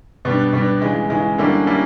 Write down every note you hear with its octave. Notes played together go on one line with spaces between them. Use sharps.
B2 G3 B3 D4
B2 G3 B3 D4
C#3 E3 G#3
C#3 E3 G#3
D3 G3 A#3 C#4 E4
D3 G3 A#3 C#4 E4